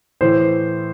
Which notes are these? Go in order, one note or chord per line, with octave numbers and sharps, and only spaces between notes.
A2 E3 C5